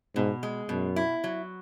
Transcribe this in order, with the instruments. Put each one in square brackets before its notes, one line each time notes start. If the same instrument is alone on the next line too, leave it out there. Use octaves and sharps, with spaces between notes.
[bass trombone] G#2 [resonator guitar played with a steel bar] B2
[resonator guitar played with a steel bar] G#3
[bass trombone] F#2 [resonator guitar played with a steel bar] B2
[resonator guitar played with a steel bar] E4
F#3